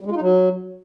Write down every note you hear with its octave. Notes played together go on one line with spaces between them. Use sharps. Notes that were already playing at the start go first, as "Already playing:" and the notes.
G3
G#3
F4
D#4
F#3